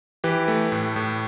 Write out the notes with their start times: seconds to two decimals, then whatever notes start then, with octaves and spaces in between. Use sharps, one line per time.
0.24 E3 G4 B4
0.48 A3
0.72 A2
0.96 A2